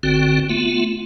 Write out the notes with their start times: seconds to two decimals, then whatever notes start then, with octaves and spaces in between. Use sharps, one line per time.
0.03 G1 D3 C4 F#4
0.49 A3 B3 F4